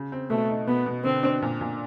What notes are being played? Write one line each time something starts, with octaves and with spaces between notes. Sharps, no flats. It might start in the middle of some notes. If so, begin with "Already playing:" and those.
Already playing: C#3
C4
B2 A3
D#4
B2 B3
B2
D3 C4
D4
A#2
A#2